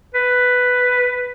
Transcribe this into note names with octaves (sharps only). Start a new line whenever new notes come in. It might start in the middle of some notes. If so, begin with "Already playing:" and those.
B4